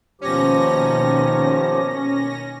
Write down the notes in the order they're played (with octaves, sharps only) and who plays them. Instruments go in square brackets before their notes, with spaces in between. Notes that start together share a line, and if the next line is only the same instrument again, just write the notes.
[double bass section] D#2 B2 D#3 [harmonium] F3 G4 [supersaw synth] C#4 A#6